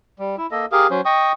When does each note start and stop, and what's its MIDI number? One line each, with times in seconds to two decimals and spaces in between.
0.19 0.36 55
0.38 0.47 64
0.51 0.66 58
0.51 0.66 69
0.51 0.66 75
0.72 0.87 67
0.72 0.87 68
0.72 0.87 70
0.72 0.87 77
0.90 1.01 54
0.90 1.01 61
0.90 1.01 72
1.05 1.32 75
1.05 1.32 79
1.05 1.32 85
1.05 1.32 87